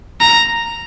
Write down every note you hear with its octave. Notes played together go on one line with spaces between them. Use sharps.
A#5